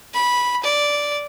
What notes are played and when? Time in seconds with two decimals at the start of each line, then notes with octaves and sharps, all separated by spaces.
0.14 B5
0.63 D5